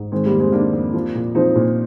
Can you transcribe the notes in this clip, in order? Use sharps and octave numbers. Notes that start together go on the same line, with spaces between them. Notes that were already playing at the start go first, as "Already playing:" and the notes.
Already playing: G#2
D#3 G#3 C4
G3 A#3
F2
G#3 C4
D#3 A#3 D4
F2
F3
A#2
F3 C4 D#4
A#2